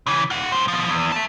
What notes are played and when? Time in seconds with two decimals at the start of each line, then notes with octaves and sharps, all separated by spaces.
0.07 C#3 E3
0.30 F4 F#5
0.52 G2 C5
0.68 B2 F3
0.89 E2
1.12 E5 A5